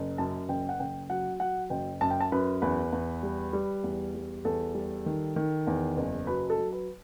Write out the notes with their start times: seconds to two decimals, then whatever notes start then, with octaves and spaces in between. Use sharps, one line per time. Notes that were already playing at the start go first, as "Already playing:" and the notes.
Already playing: F#1
0.18 F#2 A5
0.49 F#1 G5
0.69 F#5
0.79 F#1 G5
1.10 F#3 F#5
1.40 F#3 F#5
1.70 F#1 G5
2.01 F#2 A5
2.10 G5
2.21 A5
2.32 F#2 B4
2.62 E2 B4
2.93 E2
3.23 G3
3.53 G3
3.84 E2
4.15 G3
4.45 E2 A4
4.75 G3
5.06 D#3
5.36 D#3
5.67 E2
5.97 F#1
6.27 F#3 B4
6.50 A4
6.58 F#3
6.73 B4